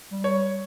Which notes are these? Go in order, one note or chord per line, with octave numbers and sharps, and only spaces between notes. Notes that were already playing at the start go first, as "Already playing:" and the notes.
G3
C#5